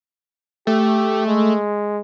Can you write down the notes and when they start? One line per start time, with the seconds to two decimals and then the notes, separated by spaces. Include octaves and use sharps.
0.67 A3 G4
1.26 G#3